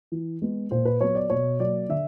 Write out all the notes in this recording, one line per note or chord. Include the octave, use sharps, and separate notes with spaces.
E3
G#3 B3
A#2 C5
B4
F#3 B3 C#5
D5
B2 C#5
F#3 A#3 D5
D3 E5